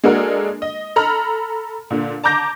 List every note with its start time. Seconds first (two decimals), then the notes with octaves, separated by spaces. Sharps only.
0.04 G#3 A#3 D4 F#4 A4 A#4
0.62 D#5
0.96 A4 A#5 B5 F6
1.90 A#2 D3
2.24 A5 A#5 D6 G6 A#6